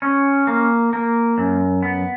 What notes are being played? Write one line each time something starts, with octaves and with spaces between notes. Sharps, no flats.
C#4
A#3
A#3
F#2
B3